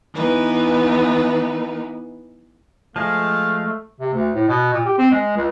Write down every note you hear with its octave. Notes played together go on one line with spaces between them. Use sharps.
E3 B3 D#4 B4
F3 G#3 A3 F5 A5
C3
D2
A2
B2
A#2
G4
C4
G#3
C#2